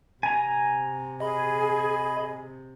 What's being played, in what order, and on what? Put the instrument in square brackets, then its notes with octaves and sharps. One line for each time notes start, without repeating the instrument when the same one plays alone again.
[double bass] C3 [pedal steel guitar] G#5 A#5
[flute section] G#4 [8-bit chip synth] D#5 B5